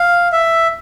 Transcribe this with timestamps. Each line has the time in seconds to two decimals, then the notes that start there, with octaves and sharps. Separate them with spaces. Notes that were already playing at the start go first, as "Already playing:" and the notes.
Already playing: F5
0.32 E5